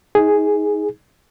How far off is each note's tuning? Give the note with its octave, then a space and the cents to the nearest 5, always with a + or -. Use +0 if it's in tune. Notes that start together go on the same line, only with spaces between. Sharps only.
D#4 +30 G#4 +0